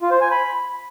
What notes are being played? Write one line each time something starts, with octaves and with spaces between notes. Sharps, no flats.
F4
C5
G#5
B5